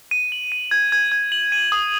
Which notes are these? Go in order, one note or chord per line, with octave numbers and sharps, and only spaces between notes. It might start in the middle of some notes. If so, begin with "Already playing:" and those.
D#7
F#7
D#7
G#6
G#6
G#6
F#7
D#7
D#6